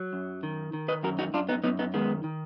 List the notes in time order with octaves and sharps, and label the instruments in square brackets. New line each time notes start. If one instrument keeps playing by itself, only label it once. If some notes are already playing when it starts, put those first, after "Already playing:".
Already playing: [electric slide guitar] F#3
F#2
D#3
D#3
B4 D#5
F#2 F#4 A#4
D#4 F#4
F#2 D4 F4
B3 D#4
F#2 B3 D#4
B3 D#4
D#3 G#3 B3
D#3